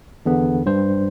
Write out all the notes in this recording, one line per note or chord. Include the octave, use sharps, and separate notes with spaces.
E2 D3 B3
G2 C5